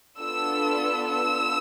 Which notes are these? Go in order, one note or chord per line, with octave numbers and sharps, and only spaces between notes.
B3 D4 F4 A4 E6
E6